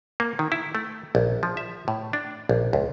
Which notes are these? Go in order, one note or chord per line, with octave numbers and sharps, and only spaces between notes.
A#3
D#3
E4
A3
A#1
F3
E5
A2
D4
A#1
C#2